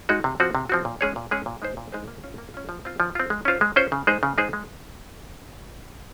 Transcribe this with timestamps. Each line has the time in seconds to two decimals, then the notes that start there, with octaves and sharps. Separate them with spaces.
0.09 G#3 D#4 F#4
0.24 C3
0.40 F3 C4 F#4
0.55 C3
0.69 F3 C4 F#4
0.85 A#2
1.01 G#3 C#4 G#4 C#5
1.16 A#2
1.31 G#3 C#4 G#4 C#5
1.46 A#2
1.62 G#3 D#4 G#4 C5
1.77 A#2
1.92 G#3 D#4 G#4 C5
2.08 A#3
2.24 C#4 F4
2.38 A#3
2.54 C#4 F4
2.69 F3
2.85 C4 F4
3.00 F3
3.15 C4 F4
3.30 G#3
3.45 C#4 F4 C5
3.61 G#3
3.76 C#4 F4 C5
3.92 C#3
4.07 G#3 D#4 G#4 C5
4.23 C#3
4.38 G#3 D#4 G#4 C5
4.53 G#3